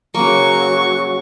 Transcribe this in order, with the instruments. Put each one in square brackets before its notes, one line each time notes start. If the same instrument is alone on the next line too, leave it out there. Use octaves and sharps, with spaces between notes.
[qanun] C#3 A#3 [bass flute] F#3 [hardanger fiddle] C#6